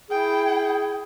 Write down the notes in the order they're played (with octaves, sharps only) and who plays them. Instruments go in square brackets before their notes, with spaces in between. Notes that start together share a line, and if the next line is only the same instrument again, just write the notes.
[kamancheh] E4 G5 [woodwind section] G#4